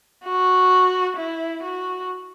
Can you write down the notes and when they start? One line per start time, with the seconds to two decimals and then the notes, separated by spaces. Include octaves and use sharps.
0.25 F#4
1.17 E4
1.62 F#4